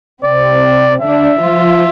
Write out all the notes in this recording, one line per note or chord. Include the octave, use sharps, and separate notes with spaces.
C3 C4 D5
D3 D4 E5
F3 F4